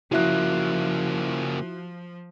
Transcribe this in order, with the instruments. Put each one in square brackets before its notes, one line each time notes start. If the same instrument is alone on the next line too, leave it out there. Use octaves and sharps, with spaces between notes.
[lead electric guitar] C#3 A#3 [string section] F3 [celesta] E4 E5 [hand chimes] F#4 F#6